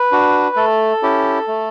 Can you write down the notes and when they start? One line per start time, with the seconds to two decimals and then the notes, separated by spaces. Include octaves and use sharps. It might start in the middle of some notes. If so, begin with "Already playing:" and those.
Already playing: B4
0.11 D4 F#4
0.56 A3 A4
1.02 C#4 E4 G4
1.48 A3